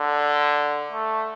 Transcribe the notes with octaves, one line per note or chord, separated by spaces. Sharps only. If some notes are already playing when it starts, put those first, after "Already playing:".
Already playing: D3
A3